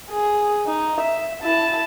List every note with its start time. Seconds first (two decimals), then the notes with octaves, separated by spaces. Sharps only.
0.10 G#4
0.66 D#4
1.01 E5
1.42 E4 A5